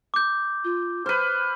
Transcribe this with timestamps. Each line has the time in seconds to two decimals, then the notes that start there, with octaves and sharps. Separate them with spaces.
0.14 D6 G6
0.64 F4
1.06 B4 C5 F6